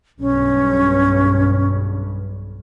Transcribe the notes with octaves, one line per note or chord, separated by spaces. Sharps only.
B1 G2 C#4